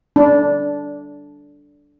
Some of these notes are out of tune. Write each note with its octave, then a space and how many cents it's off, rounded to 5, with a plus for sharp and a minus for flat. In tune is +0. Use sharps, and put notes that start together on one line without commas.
D4 -10